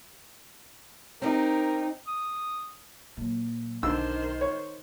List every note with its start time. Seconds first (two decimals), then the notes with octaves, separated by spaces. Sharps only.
1.22 C4 D#4 G4 A#4
2.08 D#6
3.17 A#2 F#3
3.83 B1 D3 D#3 C5 E6
4.41 C#5